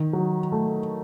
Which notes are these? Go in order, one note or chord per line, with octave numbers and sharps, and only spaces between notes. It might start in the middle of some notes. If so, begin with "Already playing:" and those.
Already playing: D#3
F#3
A3